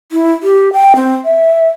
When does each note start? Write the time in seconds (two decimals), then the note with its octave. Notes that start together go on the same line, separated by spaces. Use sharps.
0.12 E4
0.43 G4
0.73 G5
0.96 C4
1.25 E5